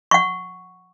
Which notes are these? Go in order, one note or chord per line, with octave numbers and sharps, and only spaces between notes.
F#5 C#6